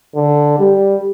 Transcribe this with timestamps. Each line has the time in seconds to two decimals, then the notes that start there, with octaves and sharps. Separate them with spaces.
0.15 D3
0.59 G3